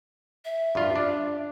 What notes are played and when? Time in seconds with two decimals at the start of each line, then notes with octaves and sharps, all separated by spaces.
0.45 E5
0.75 G2 F4
0.96 D4